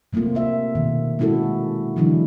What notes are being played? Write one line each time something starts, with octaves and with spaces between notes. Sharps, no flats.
C3 A3 A#3 C4 F4
A#3 E5
B2 D#3
G#3 C#4 E4 F#4 A4
D3 E3 F#3 G#3 D4 E4